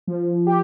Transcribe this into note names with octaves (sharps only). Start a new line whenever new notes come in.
F3
G4